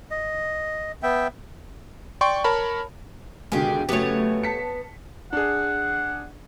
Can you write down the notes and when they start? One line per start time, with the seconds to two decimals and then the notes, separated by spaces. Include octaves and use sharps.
0.11 D#5
1.03 B3 E5 G5
2.21 D5 G5 C6 C#6
2.44 A#4 C#5 A5 B5
3.52 C#2 B2 D3 D#3 G4 G#4
3.89 F#2 C#3 A3 B3 F#4 G4 C#5
4.44 A5 B6 C#7
5.33 D4 G#4 F#5